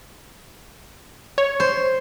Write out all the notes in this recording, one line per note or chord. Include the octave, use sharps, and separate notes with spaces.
C#5
C5